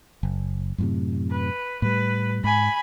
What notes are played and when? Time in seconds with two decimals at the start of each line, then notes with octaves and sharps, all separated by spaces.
0.23 F#1
0.78 F#2 A2 C3
1.31 B4
1.82 A2 G3 B4
2.44 G#2 G#5 B5